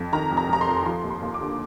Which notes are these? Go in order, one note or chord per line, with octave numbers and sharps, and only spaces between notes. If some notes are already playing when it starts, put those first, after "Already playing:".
Already playing: F2
D#3 A#5
F1
A#5
F1 A#5
C6
F2
F3 C6
D#2
C6
D#2
D6
D3